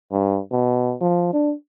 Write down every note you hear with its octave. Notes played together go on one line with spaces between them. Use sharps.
G2
B2
F3
D4